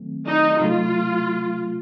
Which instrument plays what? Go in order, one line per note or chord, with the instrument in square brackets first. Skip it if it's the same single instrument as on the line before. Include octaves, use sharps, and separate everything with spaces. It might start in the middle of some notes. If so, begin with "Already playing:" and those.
Already playing: [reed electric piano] D#3 F#3 A3 C4
[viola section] D#4
[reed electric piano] C3 F#3 A3 [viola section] F4